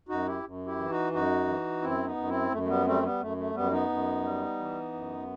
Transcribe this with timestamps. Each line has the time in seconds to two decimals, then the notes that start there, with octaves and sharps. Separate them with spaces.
0.09 F#2 D#4 F#4
0.27 E4 G4
0.44 F#2
0.66 E4 G4
0.78 E3
0.90 D#4 F#4
1.13 F#2 D#4 F#4
1.47 E3
1.81 F#2 C4 E4
2.05 B3 D#4
2.16 F#2
2.28 C4 E4
2.52 F#2 A3
2.63 A3
2.68 G3 B3
2.85 G3 A3 C4
3.03 G3 B3
3.20 F#2 A3
3.37 A3
3.54 F#2 G3 B3
3.71 B3 D#4
3.89 F#2
4.23 G3
4.59 E3
4.93 F#2